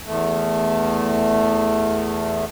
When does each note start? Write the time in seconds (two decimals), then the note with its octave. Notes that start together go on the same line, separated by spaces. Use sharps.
0.06 E2 A3